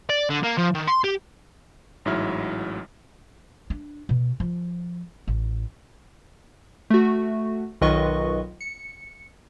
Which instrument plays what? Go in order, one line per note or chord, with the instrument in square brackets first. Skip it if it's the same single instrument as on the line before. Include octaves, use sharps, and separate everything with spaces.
[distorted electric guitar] D5
D3
A#3
F3
D#3
C6
G4
[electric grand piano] A1 G#2 F#3 E4 E5 F6
[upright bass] D4
B2
F3
A1
[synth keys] A3 F#4
B1 D#3 F4 B4 D#5 C#6
C#7